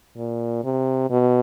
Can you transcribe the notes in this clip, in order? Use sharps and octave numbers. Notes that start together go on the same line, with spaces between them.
A#2
C3
B2